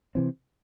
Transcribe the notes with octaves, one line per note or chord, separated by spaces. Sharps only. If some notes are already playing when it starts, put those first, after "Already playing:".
C3 E3 C4